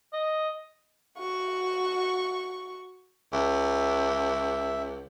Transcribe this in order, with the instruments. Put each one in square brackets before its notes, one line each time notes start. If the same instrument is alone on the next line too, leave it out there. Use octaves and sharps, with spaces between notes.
[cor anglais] D#5
[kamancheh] F#4 C#6
[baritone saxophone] C#2 [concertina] E5